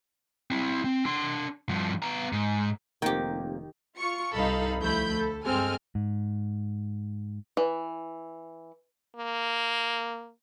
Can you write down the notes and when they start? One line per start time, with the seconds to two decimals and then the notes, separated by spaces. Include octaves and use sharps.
0.51 C4 E4
0.84 C4
1.06 D4 C6
1.69 G2 F3
2.03 B3 A#5
2.33 G#2
3.02 F1 D#3 A#3 C4 G4 G5
3.97 F4 C#6 C#7
4.35 C2 G2 D#4 A4 F5 B5
4.81 D2 F3 A3 E4 B5 G6
5.14 A4
5.46 G2 G#3 C4 A4 G#5 F6
5.95 G#2
7.57 E3
9.16 A#3